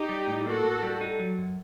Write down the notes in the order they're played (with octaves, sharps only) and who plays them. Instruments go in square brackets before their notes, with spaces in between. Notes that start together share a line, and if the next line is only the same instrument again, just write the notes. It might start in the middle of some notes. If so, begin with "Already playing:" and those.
Already playing: [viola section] D#4 G4
[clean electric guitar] G3
A2
[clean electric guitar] A#3 [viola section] F#4 A4
[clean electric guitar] A2
G3
D#4
F#3
F#2